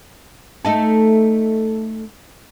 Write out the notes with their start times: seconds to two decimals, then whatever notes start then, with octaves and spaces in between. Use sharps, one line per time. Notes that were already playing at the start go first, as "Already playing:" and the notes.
0.65 A3 D#4 A4